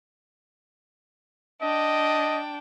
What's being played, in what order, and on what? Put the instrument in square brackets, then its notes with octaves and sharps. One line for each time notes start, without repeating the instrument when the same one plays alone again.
[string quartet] D4 G5 [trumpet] D#5